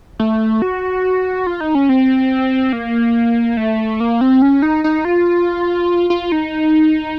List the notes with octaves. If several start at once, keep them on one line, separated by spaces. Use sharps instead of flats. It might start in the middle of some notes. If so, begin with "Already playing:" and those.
A3
F#4
F4
D#4
C#4
C4
A#3
A3
A#3
C4
C#4
D#4
D#4
F4
F4
D#4